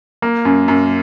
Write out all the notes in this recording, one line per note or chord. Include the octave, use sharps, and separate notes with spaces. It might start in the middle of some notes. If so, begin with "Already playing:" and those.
A#3
F#2
F#2